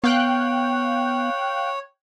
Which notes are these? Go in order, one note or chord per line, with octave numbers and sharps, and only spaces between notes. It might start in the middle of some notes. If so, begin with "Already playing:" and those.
B3 C#5 F5 G5 F#6